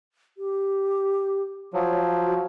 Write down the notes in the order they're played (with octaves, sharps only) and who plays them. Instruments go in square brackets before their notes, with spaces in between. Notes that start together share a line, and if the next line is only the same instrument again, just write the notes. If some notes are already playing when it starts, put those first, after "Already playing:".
[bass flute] G4
[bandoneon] F3 F#3 [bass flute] C#5
[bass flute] F#4